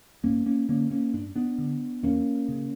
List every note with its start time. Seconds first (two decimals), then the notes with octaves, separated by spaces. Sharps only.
0.24 G2 A#3 C#4
0.46 A#3 C#4
0.69 D3 A#3 C#4
0.91 A#3 C#4
1.14 G2 D4
1.36 B3 D4
1.58 D3
2.03 E2 A#3 C#4
2.48 C#3